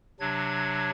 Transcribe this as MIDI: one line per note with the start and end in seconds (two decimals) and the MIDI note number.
0.20 0.90 48
0.20 0.90 54
0.20 0.90 62
0.20 0.90 92